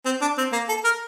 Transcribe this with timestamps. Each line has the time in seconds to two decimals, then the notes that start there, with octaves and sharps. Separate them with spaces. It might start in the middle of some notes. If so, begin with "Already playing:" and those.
0.06 C4
0.22 D4
0.38 C4
0.53 A#3
0.69 A4
0.84 A#4